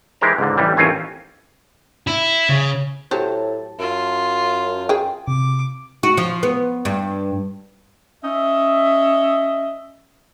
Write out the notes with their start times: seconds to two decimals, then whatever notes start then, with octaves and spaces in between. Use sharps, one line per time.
0.21 E3 G#3 G4 A#4 C5 A#5
0.38 C#2 G#2 D3
0.57 A1 E3 G3
0.77 A1 D#2 C4 C#4 F4 G#5
2.07 E4
2.49 C#3
3.11 A2 F#3 G4 C5 A5
3.79 F#2 F4
4.89 G#4 G5
5.28 C3 D6
6.03 F#4
6.17 F3
6.43 B3
6.85 G2
8.23 C#4 D#5 E5